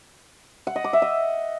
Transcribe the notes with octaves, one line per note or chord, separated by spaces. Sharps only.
F#5
D#5
D6
E5
D#5